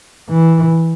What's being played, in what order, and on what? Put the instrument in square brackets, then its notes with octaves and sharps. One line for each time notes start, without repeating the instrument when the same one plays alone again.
[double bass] E3